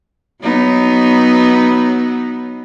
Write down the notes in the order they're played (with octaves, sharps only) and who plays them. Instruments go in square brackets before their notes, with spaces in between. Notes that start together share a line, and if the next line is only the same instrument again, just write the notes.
[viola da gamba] F#3 B3 D#4